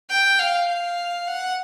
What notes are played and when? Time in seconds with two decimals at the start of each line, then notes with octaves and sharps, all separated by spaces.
0.10 G5
0.39 F5
0.69 F5
1.27 F#5